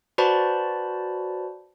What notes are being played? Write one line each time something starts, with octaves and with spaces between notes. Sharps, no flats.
F#4 B4 C5 D5 A5 B5